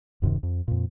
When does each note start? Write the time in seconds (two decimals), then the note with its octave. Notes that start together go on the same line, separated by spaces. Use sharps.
0.22 D1 F#2 C3 D#3
0.43 F2
0.68 F2 A#2